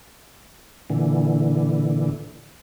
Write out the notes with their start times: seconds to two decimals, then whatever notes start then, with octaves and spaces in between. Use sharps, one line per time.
0.90 A#2 D3 E3